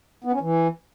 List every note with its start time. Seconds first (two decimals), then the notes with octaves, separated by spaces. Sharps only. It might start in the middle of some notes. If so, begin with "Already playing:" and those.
0.24 B3
0.32 C#4
0.40 E3